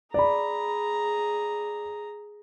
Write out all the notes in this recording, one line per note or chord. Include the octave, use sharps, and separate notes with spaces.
G#4 D5 A#5 B5